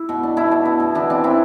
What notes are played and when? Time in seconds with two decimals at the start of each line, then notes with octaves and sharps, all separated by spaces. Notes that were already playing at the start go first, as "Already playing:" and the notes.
Already playing: E4
0.09 B2
0.23 D4
0.37 B2 E4
0.51 D4
0.65 B3
0.80 B2
0.95 E3 D4
1.10 C4 D4
1.24 C4 E4